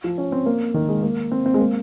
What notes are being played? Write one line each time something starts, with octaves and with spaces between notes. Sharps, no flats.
F3
C#4
C4
A#3
D#3
G#3
A#3
C4
C4
G#3
A#3